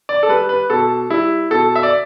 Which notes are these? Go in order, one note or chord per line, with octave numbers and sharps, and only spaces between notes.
D5
A4
G3 B4
B4
B2 A4
G3 E4
B2 A4
E5
D5